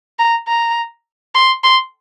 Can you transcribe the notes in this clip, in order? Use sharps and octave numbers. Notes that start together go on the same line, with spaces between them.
A#5
A#5
C6
C6